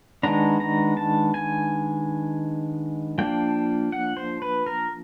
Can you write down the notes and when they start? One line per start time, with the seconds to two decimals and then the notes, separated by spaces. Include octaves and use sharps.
0.23 D#3 G#3 B3 D4 A#5
0.60 A#5
0.97 A5
1.34 G#5
3.18 F3 A#3 D4 G5
3.92 F#5
4.17 C5
4.42 B4
4.66 A#4